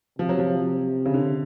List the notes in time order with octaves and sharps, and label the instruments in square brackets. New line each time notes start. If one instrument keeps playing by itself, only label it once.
[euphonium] C3 [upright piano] F3
[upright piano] F#3
F3
C#3
D3